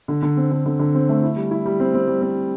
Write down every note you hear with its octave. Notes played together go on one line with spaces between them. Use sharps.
D3
D3
C4
D3
D3
D3
C4
A3
E4
G3
E4
G3
C4
C4
G3
C4